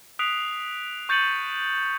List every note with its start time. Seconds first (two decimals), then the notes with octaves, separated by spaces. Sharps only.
0.19 D#6 F#6 B6 C7 D7 F7
1.09 C#6 G6 A6 C#7 D#7 F#7